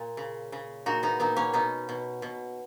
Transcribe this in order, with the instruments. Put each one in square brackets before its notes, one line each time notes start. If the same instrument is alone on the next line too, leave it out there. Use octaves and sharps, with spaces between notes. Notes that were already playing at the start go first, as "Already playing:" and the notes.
Already playing: [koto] A#2
C#3
C#3
A#2 D#4 F#4
B3 D#4
A#2 B3 D#4
A#3 C#4
B2 B3 D#4
B2
B2